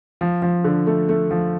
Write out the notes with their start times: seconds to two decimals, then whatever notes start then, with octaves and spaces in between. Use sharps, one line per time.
0.21 F3
0.42 F3
0.64 D3
0.87 A3
1.09 A3
1.31 F3